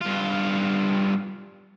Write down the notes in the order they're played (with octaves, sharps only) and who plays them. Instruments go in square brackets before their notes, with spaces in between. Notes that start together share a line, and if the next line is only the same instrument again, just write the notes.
[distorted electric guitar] G2 F4